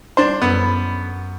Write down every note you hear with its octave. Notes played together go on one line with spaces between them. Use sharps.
D4 C5
F#2 B3 A4 B5